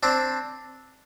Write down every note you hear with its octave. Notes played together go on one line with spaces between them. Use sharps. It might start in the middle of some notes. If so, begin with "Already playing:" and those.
C4 D4